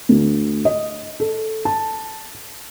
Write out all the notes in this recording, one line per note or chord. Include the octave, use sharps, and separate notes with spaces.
D2
D#5
A4
A5